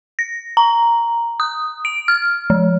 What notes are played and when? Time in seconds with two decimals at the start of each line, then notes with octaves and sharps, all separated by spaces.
0.19 A#6
0.57 A#5
1.40 D#6
1.85 D7
2.08 F6
2.50 F3